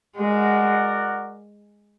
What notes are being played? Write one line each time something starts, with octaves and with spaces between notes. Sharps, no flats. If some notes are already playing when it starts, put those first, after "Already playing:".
G#3 F#4 A#4 D5 F#5